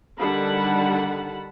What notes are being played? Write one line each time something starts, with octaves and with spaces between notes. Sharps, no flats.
D3 D#3 G3 F#5 A5 B5